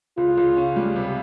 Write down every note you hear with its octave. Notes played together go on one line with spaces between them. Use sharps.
C#2 F4
C#2
C#4
G3
C3